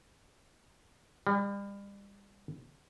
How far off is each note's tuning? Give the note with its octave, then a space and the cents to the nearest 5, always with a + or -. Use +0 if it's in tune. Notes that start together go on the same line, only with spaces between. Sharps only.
G3 +35